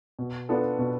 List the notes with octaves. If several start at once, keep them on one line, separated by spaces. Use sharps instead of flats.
B2
B3 D4 F4 A4
B2